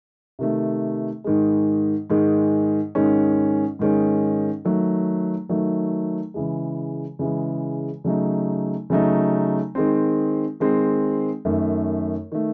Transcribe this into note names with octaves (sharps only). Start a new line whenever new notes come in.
C3 D#3 A3
G#2 D#3 G#3
G#2 D#3 G#3
G#2 D#3 G#3 C#4
G#2 D#3 G#3 C#4
D#3 F#3 A3
D#3 F#3 A3
C#3 E3 G#3
C#3 E3 G#3
C#3 F#3 A3 D#4
C#3 F#3 A3 D#4
D#3 G#3 C4
D#3 G#3 C4
F#2 D#3 A3
D#3 A3